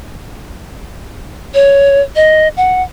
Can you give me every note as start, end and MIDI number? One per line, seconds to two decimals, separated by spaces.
1.54 2.01 73
2.16 2.48 75
2.57 2.82 78